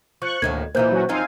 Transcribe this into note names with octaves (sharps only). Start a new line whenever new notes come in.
F3 C#6 F#6
D2 A2 D#3 A#3 G#6
A#2 E3 A#3 D#4 E4 C5 G6
F#3 C#4 F#4
F#2 F3 C4 D#4 F5 G#5